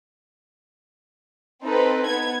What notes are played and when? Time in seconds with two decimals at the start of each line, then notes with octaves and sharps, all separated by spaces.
1.64 C4 D#4 A4 B4
2.07 B3 G#6